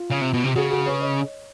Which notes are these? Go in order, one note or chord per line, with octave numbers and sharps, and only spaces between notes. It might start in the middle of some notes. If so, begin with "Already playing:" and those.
Already playing: F4
C#3
C3
B2
C3
C#3 F#4 G#4
F#4 G#4
B4 C#5
C#5 D#5